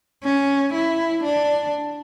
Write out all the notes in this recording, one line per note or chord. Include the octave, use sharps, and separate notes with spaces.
C#4
E4
D4